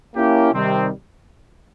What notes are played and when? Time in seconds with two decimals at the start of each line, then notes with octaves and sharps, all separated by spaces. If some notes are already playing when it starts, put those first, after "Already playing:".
0.16 A#3 C#4 E4 G4
0.52 C3 D#3 G3 C4